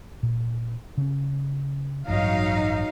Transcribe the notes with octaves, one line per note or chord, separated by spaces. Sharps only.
A#2
C#3 C#4
A1 G2 F#3 D#4 F5